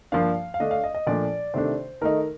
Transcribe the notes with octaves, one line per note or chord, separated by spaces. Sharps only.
G2 F3 A#3 D4 F5
F5
D3 A3 D4 D#5
F5
D#5
D#5
A#2 F3 A3 D4 D5
C3 D#3 A3 D4 C5
D#3 A3 D#4 A#4